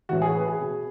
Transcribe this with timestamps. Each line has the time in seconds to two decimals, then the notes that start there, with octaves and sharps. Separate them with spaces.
0.09 A2 E3 F#4
0.22 G#4
0.35 B4
0.47 G#4
0.61 B2